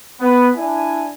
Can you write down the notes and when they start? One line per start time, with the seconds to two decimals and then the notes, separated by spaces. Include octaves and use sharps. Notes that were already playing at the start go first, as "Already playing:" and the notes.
0.21 B3
0.56 D4 E4 G#5